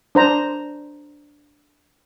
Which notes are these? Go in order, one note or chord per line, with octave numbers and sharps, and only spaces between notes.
D4 C5 A#5